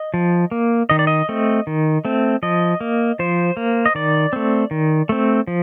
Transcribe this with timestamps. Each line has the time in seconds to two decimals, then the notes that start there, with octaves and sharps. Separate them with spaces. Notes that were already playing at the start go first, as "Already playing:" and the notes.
Already playing: D#5
0.14 F3
0.51 A#3
0.90 D#3 D#5
0.99 D5
1.07 D#5
1.29 A3 C4
1.67 D#3
2.05 A3 C4
2.43 F3 D#5
2.81 A#3
3.19 F3 C5
3.57 A#3
3.86 D#5
3.95 D#3 D5
4.33 A3 C4
4.71 D#3
5.09 A3 C4
5.47 F3